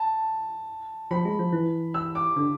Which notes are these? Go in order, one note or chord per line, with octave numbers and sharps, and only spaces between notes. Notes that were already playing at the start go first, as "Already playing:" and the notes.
Already playing: A5
F3 B5
G#3
F3
E3
E6
D6
D3